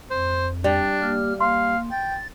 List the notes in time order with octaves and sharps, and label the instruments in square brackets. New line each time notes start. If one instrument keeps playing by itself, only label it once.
[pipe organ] F2 [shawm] C5
[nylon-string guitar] G3 [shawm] D4 [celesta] D5
[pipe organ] A#3 G4 F6
[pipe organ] A#3 [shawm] F5 [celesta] C6
[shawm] G5 [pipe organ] A6